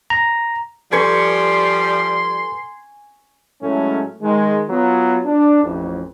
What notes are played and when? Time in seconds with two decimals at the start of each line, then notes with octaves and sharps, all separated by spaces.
0.10 A#5
0.92 F3 G3 A4 B4 G#5 C6 C#6
3.62 A2 F#3 G#3 A3 C#4
4.22 D#3 G#3
4.69 F#3 B3 F4
5.25 D4
5.63 A1 F2